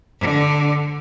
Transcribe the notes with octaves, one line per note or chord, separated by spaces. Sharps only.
D3